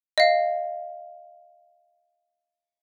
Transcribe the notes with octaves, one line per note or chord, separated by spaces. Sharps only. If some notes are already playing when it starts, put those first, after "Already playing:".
D#5 F5